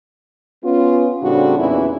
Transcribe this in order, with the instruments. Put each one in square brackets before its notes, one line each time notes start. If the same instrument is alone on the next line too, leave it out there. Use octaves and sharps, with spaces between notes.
[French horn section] B3 C#4 F4
A2 C#3 G3 C4 D4 F#4
E2 A#2 E3 C#4 D#4 E4